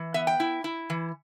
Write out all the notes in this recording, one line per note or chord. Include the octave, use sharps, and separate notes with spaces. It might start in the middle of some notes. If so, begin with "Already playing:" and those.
Already playing: E3
B3 E5
G5
E4
E4
E3